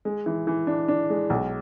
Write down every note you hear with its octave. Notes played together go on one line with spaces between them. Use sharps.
G#3
E3
E3
D4
D4
G#3
B1